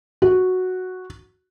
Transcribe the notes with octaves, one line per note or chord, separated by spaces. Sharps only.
F#4